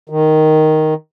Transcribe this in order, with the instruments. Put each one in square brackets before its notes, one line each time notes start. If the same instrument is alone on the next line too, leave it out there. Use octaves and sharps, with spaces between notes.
[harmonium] D#3